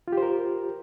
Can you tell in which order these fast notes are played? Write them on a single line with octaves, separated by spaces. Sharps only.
F4 G4 C5 A#4